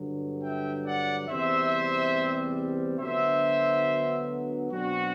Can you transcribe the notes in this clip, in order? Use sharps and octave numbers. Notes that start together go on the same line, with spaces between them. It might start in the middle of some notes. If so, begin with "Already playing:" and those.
Already playing: G2 D3 F#3
E5 G5
D5 F#5
E2 C3 G3 C4 C5 E5
D2 D3 F#3 B3 C5 E5
B2 F#3 C4 D4 F#4